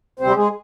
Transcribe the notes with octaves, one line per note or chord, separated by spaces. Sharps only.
D2 C3 G3 C4 C5
G4
G#3 G#4